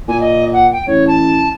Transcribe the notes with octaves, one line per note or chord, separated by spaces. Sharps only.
A#2 G#5
D#5
F#5
G5
A1 C#5
A5